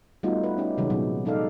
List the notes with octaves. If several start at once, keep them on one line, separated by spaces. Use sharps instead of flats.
G3 A3 B3 D#4 F4 F#4
B4
C#4 D#4 G4
C3 D#3 F#3 G#3 C#4
A#2 F#3 B3
F#3 G#3 D#4 A4 D5 F5